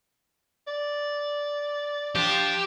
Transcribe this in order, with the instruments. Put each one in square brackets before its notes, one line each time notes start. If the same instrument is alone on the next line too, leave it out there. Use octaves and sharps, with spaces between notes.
[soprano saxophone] D5
[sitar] F3 D4 [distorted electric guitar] G4